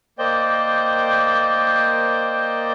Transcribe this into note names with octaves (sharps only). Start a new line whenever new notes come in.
A#3 C5 D5 D#5 G5 G6